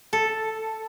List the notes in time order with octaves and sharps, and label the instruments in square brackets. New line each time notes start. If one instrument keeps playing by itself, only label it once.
[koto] A4